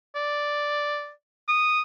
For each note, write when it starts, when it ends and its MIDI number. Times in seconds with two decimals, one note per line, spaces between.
0.16 1.11 74
1.48 1.81 87